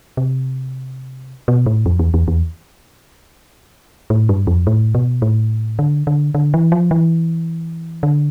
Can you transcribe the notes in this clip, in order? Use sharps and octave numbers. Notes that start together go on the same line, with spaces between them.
C3
B2
A2
F2
E2
E2
E2
A2
G2
F2
A2
B2
A2
D3
D3
D3
E3
F3
E3
D3